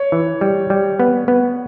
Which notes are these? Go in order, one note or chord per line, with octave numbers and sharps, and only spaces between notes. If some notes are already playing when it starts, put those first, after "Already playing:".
Already playing: C#5
E3
G3
G3
B3
B3